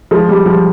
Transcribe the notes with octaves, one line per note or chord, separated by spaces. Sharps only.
F3 G#3
G3
F3